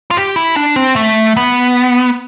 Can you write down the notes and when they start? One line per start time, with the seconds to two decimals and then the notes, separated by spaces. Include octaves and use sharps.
0.11 F4
0.17 G4
0.36 E4
0.56 D4
0.76 C4
0.96 A3
1.37 B3